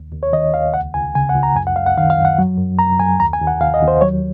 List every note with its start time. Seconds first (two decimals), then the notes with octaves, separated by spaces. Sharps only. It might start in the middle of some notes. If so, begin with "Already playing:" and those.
Already playing: D#2
0.12 D#2
0.23 C#5
0.33 D#3 D#5
0.54 D#2 F5
0.74 C#2 F#5
0.94 C#2 G#5
1.15 C#3 G#5
1.29 F#5
1.36 C#2
1.43 A#5
1.55 F#2 G#5
1.67 F#5
1.76 F#2 F5
1.86 F#5
1.97 D#3 F5
2.10 F5
2.17 F#2
2.25 F#5
2.39 F#3
2.58 F#2
2.78 F#2 A#5
3.00 F#2 G#5
3.19 D#2 A#5
3.33 G#5
3.41 D#2
3.47 F#5
3.60 D#2 F5
3.74 D#5
3.82 D#2
3.88 C5
4.01 F#3 C#5